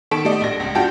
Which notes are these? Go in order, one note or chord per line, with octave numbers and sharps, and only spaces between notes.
D#3 A4 C#6 B6 D7 E7
G3 A3 D5 D#5
A#1 A#6
C#2
G2 F4 F#4 G5 A5 G6